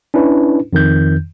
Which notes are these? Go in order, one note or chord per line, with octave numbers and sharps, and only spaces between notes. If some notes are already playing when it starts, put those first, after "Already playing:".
C#4 D4 E4 B4
F2 D#3 G6